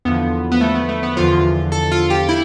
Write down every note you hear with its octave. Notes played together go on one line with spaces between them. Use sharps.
E2 D3 F3 B3
B3
A3
B3
A3
B3
E2 D3 F3 F4
A4
F4
G4
E4